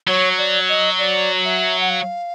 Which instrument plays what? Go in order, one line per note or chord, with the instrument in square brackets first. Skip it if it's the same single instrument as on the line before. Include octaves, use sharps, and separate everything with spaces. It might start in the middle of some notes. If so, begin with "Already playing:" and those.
[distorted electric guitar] F#3 [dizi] C#5
[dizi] D5
D#5
D5
E5
F#5
F5